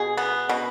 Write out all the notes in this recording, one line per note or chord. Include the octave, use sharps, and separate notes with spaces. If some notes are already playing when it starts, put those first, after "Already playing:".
Already playing: B2 G#4
B3
B2